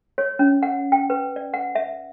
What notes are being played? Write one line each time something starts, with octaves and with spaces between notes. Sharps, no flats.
C#5
C#4
F#5
G5
B4
D5
F#5
E5